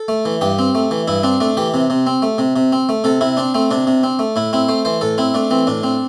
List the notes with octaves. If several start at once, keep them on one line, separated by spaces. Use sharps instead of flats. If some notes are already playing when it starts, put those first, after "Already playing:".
Already playing: A4
A3
E3
G2 G4
C4
A3
E3
G2 E4
C4 D4
A3 D4
E3 G4
C3
C3
C4
A3
C3
C3
C4
A3
C3 A4
C3 E4
C4 D4
A3 C4
C3 D4
C3
C4
A3
A2 E4
C4 E4
A3 C5
E3 C5
A2 A4
C4 E4
A3 D4
E3 C4
A2 D4
C4